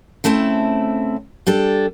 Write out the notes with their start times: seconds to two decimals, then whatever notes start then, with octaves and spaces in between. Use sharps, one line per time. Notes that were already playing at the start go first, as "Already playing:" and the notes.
0.24 C#3 A3 C4 E4 A5
1.47 G3 D4 A4